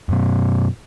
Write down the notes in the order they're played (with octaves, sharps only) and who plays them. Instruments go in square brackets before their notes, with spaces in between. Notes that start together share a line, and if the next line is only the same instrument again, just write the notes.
[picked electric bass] F#2 B2